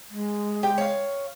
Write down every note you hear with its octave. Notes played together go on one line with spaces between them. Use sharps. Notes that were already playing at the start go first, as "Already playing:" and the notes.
G#3
G4 G5
C#5 F5